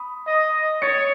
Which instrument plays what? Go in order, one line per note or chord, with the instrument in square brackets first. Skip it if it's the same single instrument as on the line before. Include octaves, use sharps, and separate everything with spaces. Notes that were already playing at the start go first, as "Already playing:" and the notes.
Already playing: [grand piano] B5 D#6
[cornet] D#5
[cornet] C#5 [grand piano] A6 C#7